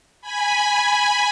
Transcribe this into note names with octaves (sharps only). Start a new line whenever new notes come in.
G#5 B5